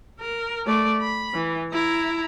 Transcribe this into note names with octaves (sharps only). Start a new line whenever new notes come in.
A#4
A3 D5
B5
E3
E4 A#5